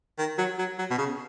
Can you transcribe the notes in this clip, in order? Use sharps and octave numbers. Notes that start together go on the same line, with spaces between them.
D#3
F#3
F#3
F#3
B2
C#3